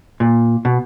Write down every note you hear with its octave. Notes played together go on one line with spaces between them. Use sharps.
A#2
B2